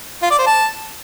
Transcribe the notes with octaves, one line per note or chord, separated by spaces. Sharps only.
F4
D5
C5
A5